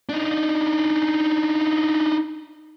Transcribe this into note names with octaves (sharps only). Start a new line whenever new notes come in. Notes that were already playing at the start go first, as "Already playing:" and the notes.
D4 D#4